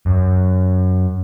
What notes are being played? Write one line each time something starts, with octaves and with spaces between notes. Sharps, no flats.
F#2